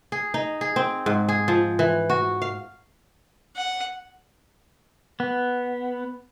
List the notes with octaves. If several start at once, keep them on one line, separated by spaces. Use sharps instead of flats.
G#4
D#4
G#4
C4
G#2
G#4
F3
E3
F#4
F5
F#5
B3